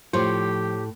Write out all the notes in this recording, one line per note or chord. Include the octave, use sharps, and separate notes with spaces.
A2 F3 G4 C5 C#5